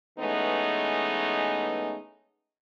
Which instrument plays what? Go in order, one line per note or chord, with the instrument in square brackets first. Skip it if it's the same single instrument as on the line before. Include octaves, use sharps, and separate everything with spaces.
[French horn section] E3 G#3 A3 B3 C#4 D#4